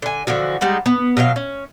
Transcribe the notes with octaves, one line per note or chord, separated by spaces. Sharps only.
D3 G#5
D3 E3 F3 F#4
G3 G#3 D#4 F#5
B3
B2 F#3 F#4 F5
C#4